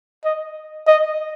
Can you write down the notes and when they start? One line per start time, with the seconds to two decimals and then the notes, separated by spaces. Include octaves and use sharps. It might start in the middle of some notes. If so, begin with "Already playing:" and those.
0.24 D#5
0.87 D#5